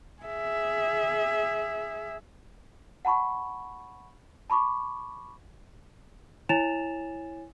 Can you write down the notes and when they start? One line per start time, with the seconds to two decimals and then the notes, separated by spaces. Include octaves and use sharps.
0.23 G#4 E5
3.05 F#5 A5 B5 C#6
4.50 A5 B5 C#6 D6
6.49 E4 C#5 G#5 A6 E7 F7